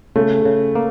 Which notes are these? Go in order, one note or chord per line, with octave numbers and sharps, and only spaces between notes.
C#3 A3
C#3
A#3